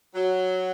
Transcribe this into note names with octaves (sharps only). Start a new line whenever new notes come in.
F#3